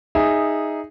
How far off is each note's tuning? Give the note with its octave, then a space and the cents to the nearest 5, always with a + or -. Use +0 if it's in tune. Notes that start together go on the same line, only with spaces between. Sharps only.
D#4 +0 G#4 -10 E5 +0